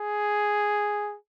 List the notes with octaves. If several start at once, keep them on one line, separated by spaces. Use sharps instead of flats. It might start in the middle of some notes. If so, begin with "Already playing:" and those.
Already playing: G#4